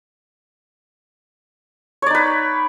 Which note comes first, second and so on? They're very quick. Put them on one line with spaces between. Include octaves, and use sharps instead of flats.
C#5 D5 D#4 B4